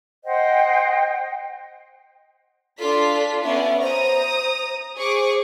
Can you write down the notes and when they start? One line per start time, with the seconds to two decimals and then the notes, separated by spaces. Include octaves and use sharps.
0.25 C5 D#5 F#5 G5
2.79 D4 F4 A4 B6
3.44 B3 C#4 D5 E5
3.81 C5 A#5 D#6
4.97 G#4 C5 C#6 D6